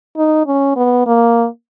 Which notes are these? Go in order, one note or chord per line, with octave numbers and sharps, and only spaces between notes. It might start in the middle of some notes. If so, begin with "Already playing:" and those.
D#4
C#4
B3
A#3